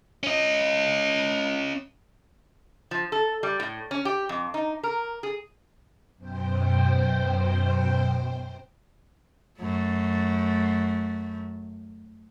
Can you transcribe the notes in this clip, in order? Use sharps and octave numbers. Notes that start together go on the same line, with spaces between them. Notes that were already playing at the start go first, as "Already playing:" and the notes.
C#4 D#5
F3
A4
G3
A2
C#4
G4
F2
D#4
A#4
G#4
F#2 B2 C5 G5
F#2 A3